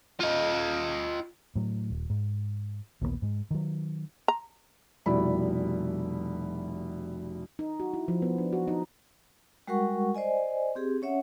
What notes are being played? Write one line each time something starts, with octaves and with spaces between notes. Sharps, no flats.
F4 D#5
A2 F#3
D#1
G#2
A#1 D#2 G3 B3
G#2 G#3
D#3 F#3
A#5
F1 B2 G3 E4 D5 B5
D#4
F#4
E4
F3
B3
D4
F#4
D#4
G3 G#3 F#4 A#4 F#5 C#6
C5 D5 D#5 G#5
C4 G4 G#4
C#4 C#5 E5 F#5